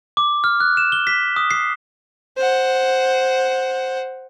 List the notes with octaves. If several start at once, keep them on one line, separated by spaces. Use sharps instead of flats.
D6
F6
F#6
E7
G7
B6
D#6
C7
C5 F#5